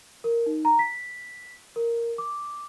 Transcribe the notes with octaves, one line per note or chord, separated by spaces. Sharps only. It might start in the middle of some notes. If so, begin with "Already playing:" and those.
A#4
D#4
A#5
B6
A#4
D6